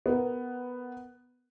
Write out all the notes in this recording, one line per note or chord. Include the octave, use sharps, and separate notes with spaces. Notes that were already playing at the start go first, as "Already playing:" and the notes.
B3 A#4